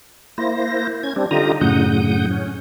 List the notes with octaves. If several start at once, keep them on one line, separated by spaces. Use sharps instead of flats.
A#3 E4 C5 A#6
C#4 G#6
G3 C4 D4
D3 D#4 F4 G4 A#5 D#6
F#2 A2 C#3 F#5 D#6 G6
C#4